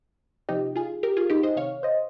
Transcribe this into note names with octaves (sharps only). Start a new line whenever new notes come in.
C3 F3 D#4 G4
F4 G#4
G4 A#4
F4 G#4
D#4 G4
C5 D#5
C3 D#3 C#5 F5
C5 D#5